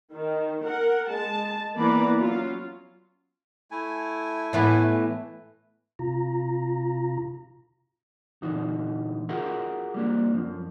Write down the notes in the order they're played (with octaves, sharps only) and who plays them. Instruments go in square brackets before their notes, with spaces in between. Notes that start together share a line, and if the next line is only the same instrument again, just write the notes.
[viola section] D#3
A#4 F#5
G#3 A5
E3 A#3 B3 B4 D5 A#5
F#3 C#4 F4
[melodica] A3 E4 G#5
[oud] A2 E3 B3
[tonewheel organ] C3 F4 A#5
[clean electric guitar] A#2 D3 E3 D#4 F#4
F4 F#4 G#4 A#4 E5 F#5
G3 A#3 D4
F#2 F3